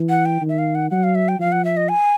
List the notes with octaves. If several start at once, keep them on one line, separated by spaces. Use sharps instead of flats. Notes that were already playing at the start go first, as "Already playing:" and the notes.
Already playing: E3
F#5
G5
D#3
E5
F5
F#5
F#3 F#5
F5
E5
G5
F3 F5
F#5
E5
D#5
G#5